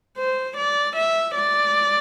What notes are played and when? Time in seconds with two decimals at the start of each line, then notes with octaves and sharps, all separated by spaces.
0.18 C5
0.57 D5
0.96 E5
1.36 D5